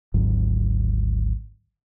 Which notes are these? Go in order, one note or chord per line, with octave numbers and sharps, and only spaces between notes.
G#1 D2 G#2 F#3